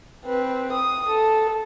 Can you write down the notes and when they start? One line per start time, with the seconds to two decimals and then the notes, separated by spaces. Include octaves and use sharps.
0.26 C4 B4
0.72 D#6
1.08 A4